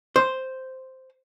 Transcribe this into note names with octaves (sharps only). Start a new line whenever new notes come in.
C5